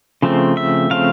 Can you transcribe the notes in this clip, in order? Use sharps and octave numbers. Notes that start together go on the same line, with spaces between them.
C#3 F3 A3 C4
E5
C#3 F3 A3 C4 F5